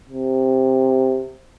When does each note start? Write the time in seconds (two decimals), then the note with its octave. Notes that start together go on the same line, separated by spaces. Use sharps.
0.09 C3